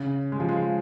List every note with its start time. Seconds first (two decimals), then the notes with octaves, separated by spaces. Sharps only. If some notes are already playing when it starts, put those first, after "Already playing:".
Already playing: C#3
0.32 G#3
0.40 F3
0.49 G#3